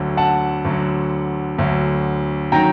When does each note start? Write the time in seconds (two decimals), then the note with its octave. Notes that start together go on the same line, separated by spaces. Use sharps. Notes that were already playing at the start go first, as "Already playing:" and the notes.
Already playing: D2 D3 F#3
0.17 F#5 A5
0.65 D2 D3 F#3
1.58 D2 D3 F#3
2.52 D#3 F#3 G5 A#5